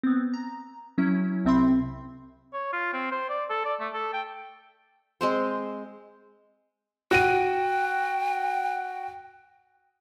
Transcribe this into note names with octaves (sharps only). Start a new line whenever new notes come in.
B3 C4
A#5
F#3 C#4 E4
C2 C3 C4 E5 B5 C6
C#5
F4
C4
C5
D5
A4
D5
A3
A4
G5
G#3 C4 C5
F#4 G5 D#7